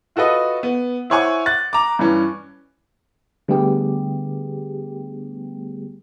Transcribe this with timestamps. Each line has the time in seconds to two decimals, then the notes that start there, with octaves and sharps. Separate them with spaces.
0.16 F4 F#4 A4 B4 D#5
0.63 B3
1.10 E4 C5 C#5 F#5 G#5 C#6
1.46 F#6 A6
1.73 A#5 D6
1.99 G2 E3 C#4
3.48 D3 G3 A3 B3 G4 G#4